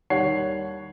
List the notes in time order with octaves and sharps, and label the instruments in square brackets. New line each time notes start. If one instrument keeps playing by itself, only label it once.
[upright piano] D#2 G3 C#5 F#5 C7